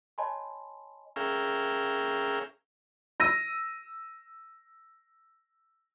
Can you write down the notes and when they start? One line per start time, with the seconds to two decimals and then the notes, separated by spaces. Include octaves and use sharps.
0.18 C#5 D#5 G#5 A5 B5 C6
1.16 C#4 G#4 A#4 E5 F5 G5
3.20 E6 A#6 D#7